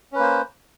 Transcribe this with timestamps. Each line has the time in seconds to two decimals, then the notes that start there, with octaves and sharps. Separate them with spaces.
0.12 C#4
0.16 B4
0.19 A#3
0.22 C5